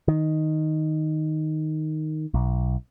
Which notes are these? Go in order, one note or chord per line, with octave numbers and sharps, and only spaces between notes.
D#3
B1